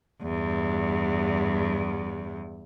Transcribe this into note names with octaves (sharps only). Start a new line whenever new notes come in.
E2 G2